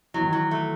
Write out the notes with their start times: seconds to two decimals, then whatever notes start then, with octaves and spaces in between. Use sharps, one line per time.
0.14 E3 F#3
0.21 D#3
0.29 E3 F#3
0.51 A3